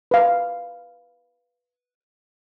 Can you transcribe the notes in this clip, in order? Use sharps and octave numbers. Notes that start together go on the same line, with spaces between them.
B4 F5